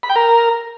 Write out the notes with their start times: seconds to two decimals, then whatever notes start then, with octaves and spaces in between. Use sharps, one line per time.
0.03 B5
0.09 G5
0.16 A#4